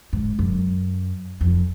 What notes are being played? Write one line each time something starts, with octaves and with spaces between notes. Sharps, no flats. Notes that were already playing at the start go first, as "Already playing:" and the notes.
G#2
F#2
F2